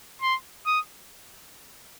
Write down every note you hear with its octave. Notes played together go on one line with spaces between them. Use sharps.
C6
D#6